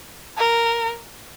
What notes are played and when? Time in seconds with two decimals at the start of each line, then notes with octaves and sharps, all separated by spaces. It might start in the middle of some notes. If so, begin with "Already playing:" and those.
0.38 A#4